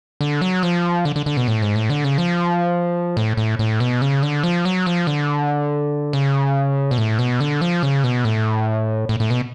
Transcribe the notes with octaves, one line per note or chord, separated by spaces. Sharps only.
D3
F#3
F3
D3
D3
D3
B2
A2
G#2
A2
D3
C#3
F3
A2
A2
A2
B2
C#3
D3
F3
F#3
F3
D3
C#3
B2
A2
B2
D3
F3
C#3
B2
A2
A2
A2
B2